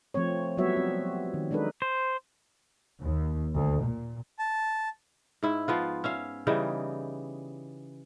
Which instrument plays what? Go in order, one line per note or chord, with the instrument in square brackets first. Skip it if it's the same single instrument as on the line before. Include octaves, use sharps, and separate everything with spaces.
[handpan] F3 A3 C4 C#5
F#3 G3 B3 F#4 C#5 E5
C4
D#3
G#3 D4 D#4 A4 B4
[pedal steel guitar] C5
[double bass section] D#2
D2
A#2
[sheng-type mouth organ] A5
[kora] G#2 E4 E5
F3 B3 F4
C#4 E5 F5
C#3 E3 G3 D#4